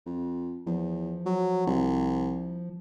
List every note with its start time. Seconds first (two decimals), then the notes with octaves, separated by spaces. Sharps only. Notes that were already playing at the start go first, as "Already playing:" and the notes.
0.06 F2
0.66 E2 F3
1.26 F#3
1.67 C2